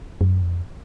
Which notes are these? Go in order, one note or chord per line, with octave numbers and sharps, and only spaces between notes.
F#2
F2